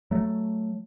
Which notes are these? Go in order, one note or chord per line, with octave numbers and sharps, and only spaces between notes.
F#3 A3